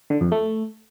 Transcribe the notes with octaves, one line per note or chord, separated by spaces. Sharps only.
D3
F2
A3